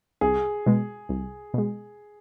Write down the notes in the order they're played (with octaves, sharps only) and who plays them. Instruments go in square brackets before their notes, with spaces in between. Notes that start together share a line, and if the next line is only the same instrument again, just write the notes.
[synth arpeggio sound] C2 [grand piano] G#4
[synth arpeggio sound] B2 G#3
C2
B2 G#3